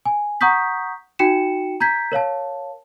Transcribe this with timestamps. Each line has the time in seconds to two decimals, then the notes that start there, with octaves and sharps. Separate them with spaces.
0.05 G#5
0.41 F#5 A#5 C#6 D#6 G6 B6
1.19 D#4 F#4 G5 C#7 E7
1.80 A#5 G6 G#6 B6
2.12 A#4 C#5 F5 A5